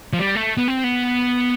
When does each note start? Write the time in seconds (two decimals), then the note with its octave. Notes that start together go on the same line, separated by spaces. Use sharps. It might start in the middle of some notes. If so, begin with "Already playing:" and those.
0.13 F3
0.19 G3
0.36 A3
0.57 B3
0.68 C4
0.84 B3